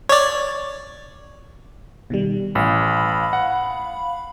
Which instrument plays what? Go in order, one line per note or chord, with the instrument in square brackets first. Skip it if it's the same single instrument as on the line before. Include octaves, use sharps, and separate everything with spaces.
[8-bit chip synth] C#5 D5
[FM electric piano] B2 D#3 G3
[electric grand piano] A1 [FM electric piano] F5 B5
[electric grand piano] F#5